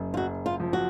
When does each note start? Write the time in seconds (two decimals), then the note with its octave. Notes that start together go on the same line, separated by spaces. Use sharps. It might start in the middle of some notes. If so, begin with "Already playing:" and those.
Already playing: F#1 F#2
0.14 F4
0.17 F#1 F#4
0.46 F4
0.60 F3
0.73 F#4